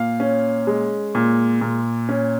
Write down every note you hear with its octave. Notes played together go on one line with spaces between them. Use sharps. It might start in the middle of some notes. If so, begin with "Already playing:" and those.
Already playing: A#2 F5
C#4
G#3
A#2
A#2
C#4